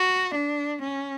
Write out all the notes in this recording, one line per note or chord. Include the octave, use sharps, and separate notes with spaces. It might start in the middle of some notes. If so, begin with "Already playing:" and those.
Already playing: F#4
D4
C#4